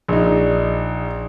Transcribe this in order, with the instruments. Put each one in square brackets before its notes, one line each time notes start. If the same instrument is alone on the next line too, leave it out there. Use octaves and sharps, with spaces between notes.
[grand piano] A#1 D#4